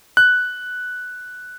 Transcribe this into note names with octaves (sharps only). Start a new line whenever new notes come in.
F#6